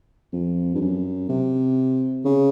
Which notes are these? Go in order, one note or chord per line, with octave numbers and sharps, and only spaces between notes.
F2
G2
F#2
C3
C#3